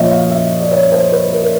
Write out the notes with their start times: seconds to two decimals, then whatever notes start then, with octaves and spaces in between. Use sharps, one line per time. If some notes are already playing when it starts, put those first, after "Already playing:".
Already playing: A#2 F3 C#5 D#5 E5
0.11 F5
0.30 E5
0.60 D5
0.71 C#5
0.92 C5
1.12 B4
1.32 A#4
1.43 B4